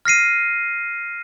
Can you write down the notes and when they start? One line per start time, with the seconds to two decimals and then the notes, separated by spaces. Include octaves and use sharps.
0.05 F6 A#6 C7 D#7